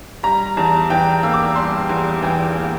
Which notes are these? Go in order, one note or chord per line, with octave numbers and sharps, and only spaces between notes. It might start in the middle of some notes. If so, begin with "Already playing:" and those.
G3 A#5
E2 A5
E3 G5
A#3 E6
D6
E6
G3 C6
E2
E3 G5
A#3